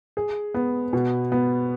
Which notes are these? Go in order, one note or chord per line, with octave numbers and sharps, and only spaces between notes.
G#4
B3
B2
B3